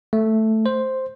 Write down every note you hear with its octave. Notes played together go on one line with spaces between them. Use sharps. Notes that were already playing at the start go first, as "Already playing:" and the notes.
A3
C5